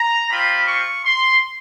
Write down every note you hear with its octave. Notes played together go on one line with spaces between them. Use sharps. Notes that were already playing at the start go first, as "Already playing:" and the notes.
Already playing: A#5
G3 C4 F4 B5
C#6
C6